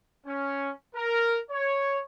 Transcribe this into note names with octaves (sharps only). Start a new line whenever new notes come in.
C#4
A#4
C#5